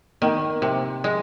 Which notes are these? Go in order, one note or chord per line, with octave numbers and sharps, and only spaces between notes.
D#3 A#3
C3
G#3